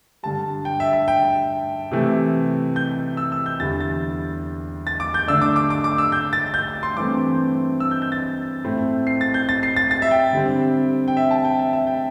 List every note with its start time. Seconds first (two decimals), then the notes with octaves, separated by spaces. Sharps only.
0.23 G2 D3 G3 A5
0.65 G5
0.80 E5
0.93 E5
1.08 G5
1.91 C3 E3 A3
2.76 G6
3.17 E6
3.32 E6
3.46 G6
3.60 E2 D3 G3 E4 A6
3.80 A6
4.87 A6
5.00 D6
5.14 G6
5.28 D3 A3 D4 E6
5.41 D6
5.56 D6
5.70 D6
5.84 D6
5.98 E6
6.12 G6
6.33 A6
6.54 G6
6.83 C6
6.96 G2 E3 A3 C4 D6
7.80 E6
7.91 G6
8.02 G6
8.12 A6
8.64 A2 A3 C4 E4
9.07 C7
9.21 A6
9.34 G6
9.49 A6
9.63 C7
9.76 A6
9.91 A6
10.02 E5
10.11 G5
10.33 D3 G3 C4
11.08 G5
11.17 E5
11.31 A5
11.45 G5
11.59 E5
11.73 E5
11.87 G5